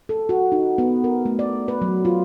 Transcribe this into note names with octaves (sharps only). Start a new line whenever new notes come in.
A4
F#4
D#4
B3
A#4
A3
D5
B4
F#3
F4